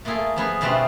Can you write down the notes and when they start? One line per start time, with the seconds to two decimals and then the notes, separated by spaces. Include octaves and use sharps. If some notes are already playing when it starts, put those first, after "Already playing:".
0.05 A3 A#3 F4 G#4 A4
0.36 F3 B3 G#4
0.61 B2 G3 A3 C4 D4 F4